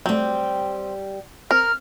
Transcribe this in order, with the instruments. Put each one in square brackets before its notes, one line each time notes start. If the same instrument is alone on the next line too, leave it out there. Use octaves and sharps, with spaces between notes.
[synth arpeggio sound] F#3 A3 [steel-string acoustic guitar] G3 G4 [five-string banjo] C4
[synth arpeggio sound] C4 [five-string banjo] A#4 [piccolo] F6